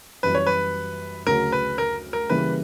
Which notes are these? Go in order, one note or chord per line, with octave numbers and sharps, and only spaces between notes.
F#2 E3 G3 B4
C#5
B4
D2 C#3 F#3 C#4 F#4 A#4
B4
A#4
A#4
C#3 E3 G3 A#3 B4